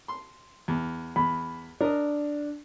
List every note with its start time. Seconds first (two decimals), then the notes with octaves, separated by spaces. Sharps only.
0.08 C6
0.68 E2
1.16 E2 B5
1.81 D4 A#4 D#5